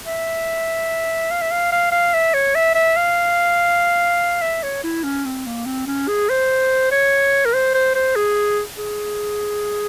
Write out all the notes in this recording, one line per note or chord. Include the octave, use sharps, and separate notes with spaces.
E5
F5
E5
F5
F5
F5
E5
C#5
E5
E5
F5
E5
C#5
E4
C#4
C4
A#3
C4
C#4
G#4
C5
C#5
A#4
C5
C5
C5
G#4
G#4